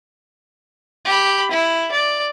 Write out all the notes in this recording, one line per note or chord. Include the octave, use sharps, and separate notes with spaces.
G4 B5
E4
D5